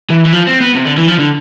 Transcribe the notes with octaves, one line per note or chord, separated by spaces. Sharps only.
E3
E3
F3
C4
B3
C3
D3
E3
F3
D3